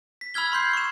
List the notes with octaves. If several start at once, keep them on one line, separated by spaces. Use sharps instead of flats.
B6
B5 E6 F6 G#6 G7
B5 C6 G6 C7
C#6 E7